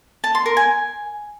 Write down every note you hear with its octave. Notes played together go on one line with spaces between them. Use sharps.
A5
C6
A#4
G#5